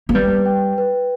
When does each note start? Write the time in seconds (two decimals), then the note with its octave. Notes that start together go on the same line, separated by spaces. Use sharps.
0.09 A#3
0.15 G3 B4
0.46 G5
0.78 B4